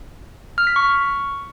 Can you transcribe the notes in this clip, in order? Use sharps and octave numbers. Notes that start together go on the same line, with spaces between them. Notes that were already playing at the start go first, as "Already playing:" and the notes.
F6
B6
C#6